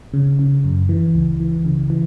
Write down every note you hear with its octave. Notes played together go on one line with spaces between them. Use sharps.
C#3
C#3
F#2
E3
C#2
E3
C#3
E3